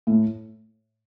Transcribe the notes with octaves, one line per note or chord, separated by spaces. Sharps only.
A2